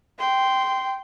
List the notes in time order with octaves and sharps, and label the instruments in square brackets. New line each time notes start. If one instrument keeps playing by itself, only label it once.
[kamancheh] G5 C6